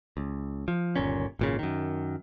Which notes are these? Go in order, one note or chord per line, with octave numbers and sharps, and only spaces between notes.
C#2
F3
G1 D#2 A#2 C#4
G#1 A#2 C#3
F#2 D#3